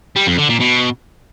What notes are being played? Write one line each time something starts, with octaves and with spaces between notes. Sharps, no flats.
G3
F2
D3
A#2
B2